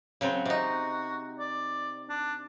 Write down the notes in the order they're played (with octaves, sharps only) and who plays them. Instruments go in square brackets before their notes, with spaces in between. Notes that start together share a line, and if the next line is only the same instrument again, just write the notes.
[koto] C#3 F#3 C4
[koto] C3 D#4 [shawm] F#4
[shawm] D5
D4